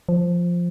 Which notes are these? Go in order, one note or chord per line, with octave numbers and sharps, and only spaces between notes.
F3